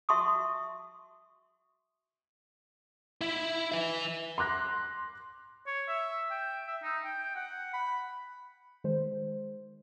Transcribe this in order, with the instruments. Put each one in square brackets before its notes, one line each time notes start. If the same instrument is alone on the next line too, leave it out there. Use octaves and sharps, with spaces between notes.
[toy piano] F#4 E5 A5 C6 C#6 D#6
[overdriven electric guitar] E4 E5
B4 E5
[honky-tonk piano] C6 D6 F#6 A#6
[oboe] C#5
E5
G5
E5
D#4
G5
F#5
B5
[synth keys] D#3 G#3 C5